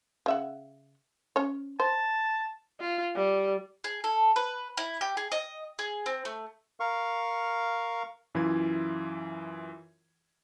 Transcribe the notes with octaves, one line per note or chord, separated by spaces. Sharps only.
C#3 E5 F#5
C#4 C#5
C5 A5
F4
G3
G#4
A4
B4
E4
G4
G#4
D#5
G#4
C4
A3
A#4 F5 C#6
F#2 E3 E4 F4 G#6